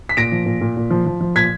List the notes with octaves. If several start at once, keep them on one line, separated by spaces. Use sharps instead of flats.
B6
A#2 A#6 D7
F3
A#2
A#2
A#2
F3
F3
F3
A#2 G#6 B6